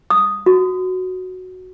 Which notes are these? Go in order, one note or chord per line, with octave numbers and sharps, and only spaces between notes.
D#6
F#4